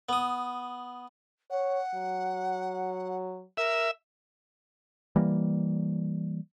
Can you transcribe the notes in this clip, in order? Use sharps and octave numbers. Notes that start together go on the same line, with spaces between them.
B3 D#6
C#5 F#5
F#3
A#4 E5
E3 G3 A#3